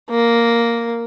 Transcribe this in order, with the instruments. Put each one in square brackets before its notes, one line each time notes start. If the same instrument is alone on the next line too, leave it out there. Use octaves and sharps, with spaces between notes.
[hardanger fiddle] A#3